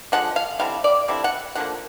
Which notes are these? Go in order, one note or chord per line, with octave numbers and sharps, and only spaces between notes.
D3 F3 G#3 F#5
F5
D3 G3 C4 E4 F5
D5
D3 G3 C4 E4
F#5
D3 F3 A#3 F#5